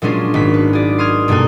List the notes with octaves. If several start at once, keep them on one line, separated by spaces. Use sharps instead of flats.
A#2 F#3 G#3 C#4 D4 F4
G#1 B6
B4
G#4 D5
C6 D#6 F6 G#6
G2 B2 A#3 F#4 A4 G#5